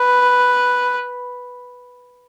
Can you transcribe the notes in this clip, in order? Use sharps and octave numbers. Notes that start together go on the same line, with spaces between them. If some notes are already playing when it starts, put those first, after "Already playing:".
Already playing: B4